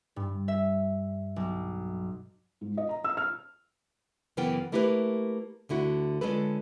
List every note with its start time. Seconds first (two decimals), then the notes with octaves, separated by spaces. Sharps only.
0.16 G2
0.48 E5
1.36 B1
2.61 G#2
2.77 D#5
2.89 A#5
3.04 E6
3.17 F6
4.37 F#2 C#3 E3 A#3 B3 G5
4.72 A3 A#3 E4 G4 G#4 B4
5.69 D2 D3 E4 F#4
6.21 D3 G#3 C#4 F4 A4 B4